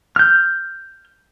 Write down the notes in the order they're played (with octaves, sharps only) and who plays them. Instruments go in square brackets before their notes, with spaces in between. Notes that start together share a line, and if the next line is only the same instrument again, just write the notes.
[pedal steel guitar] F6 G6